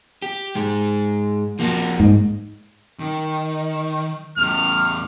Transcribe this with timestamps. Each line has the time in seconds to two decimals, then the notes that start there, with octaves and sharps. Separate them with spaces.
0.22 G4
0.55 G#2 G#3
1.59 F3 A#3 F#4
2.00 G#2
3.00 D#3
4.38 E2 A2 F6